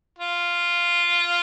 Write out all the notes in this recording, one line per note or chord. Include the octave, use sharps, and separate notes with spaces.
F4